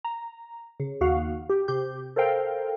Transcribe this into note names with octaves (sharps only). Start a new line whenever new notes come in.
A#5
C#3
D#2 F#4 F5 F#5
G4
C3 G4 G6
A4 A#4 C5 F5 G5